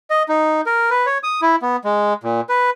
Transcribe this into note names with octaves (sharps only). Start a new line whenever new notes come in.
D#5
D#4
A#4
B4
C#5
D#6
E4
B3
G#3
A#2
B4